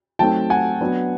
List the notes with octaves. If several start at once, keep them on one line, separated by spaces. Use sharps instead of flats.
F#3 A3 C4 D#4 G5 A5
F#5 G#5
F#3 B3 D4